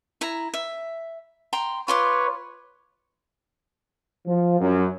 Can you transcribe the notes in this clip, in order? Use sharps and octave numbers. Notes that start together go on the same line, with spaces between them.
E4 A#5
E5
G5 A#5 C6
F4 B4 C#5 C6 D6
F3
F#2